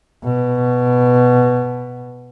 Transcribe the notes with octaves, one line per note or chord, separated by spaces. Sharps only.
B2